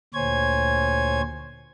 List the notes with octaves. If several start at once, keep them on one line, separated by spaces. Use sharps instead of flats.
D2 A#2 C5 C#5 G#5 G#6